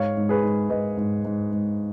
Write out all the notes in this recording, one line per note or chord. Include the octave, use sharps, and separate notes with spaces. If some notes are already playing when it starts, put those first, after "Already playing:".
Already playing: G#2 C#5 F5
G#2
G#4 B4
G#2
G#2 B4 D#5
G#2
G#2
G#2